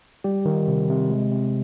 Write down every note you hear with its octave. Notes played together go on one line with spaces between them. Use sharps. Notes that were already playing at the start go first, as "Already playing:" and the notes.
G3 G4
D#3
C3
C3
G#3
C3